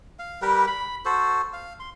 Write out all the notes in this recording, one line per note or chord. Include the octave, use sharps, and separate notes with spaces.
F5
G3 G4 A#4 B4
B5
F#4 A4 C5
F5
C6